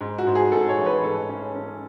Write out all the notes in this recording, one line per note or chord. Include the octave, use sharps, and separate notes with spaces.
G#2
F#4
G#2
G#4
G#2 A4
C#5
A1
B4
G#2 A4
C#4
C#4